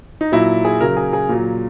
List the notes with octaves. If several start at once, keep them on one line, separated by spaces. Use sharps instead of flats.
D#4
A#2 F#3 E4
G#4
C#3 F#3 A#4
G#4
G#4
A#2 F#3